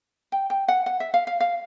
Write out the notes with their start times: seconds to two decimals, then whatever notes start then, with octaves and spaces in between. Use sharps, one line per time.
0.32 G5
0.50 G5
0.68 F#5
0.86 F#5
1.00 E5
1.14 F5
1.27 F5
1.40 F5